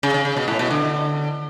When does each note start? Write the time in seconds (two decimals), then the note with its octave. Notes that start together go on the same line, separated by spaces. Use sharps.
0.03 C#3
0.14 C#3
0.25 C#3
0.37 B2
0.48 A2
0.59 B2
0.71 D3